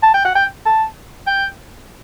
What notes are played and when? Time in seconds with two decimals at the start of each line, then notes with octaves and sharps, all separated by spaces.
0.03 A5
0.14 G5
0.25 F#5
0.35 G5
0.65 A5
1.27 G5